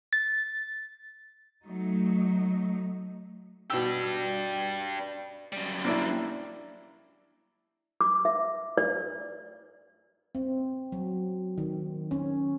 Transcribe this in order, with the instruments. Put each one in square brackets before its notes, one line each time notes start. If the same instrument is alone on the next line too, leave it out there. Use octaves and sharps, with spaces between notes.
[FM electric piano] A6
[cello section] F#3 A3 D#4
[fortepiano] B2 E6 [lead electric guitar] D4 G4
[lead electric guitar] F#2 G3
[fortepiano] A#3 D4 E4
[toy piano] D6
E5
D5
[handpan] C4
F#3
D#3
C#4